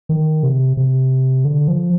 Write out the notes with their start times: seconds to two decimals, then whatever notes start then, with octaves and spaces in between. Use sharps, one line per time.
0.09 D#3
0.43 C3
0.77 C3
1.45 D3
1.68 F3